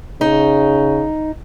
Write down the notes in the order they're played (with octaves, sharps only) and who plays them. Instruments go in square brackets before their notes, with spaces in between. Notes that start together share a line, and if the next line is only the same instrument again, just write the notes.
[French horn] C#3 [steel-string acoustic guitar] D#4